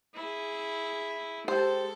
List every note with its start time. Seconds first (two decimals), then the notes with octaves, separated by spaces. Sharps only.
0.15 E4 G#4
1.48 G#3 G4 A4 C5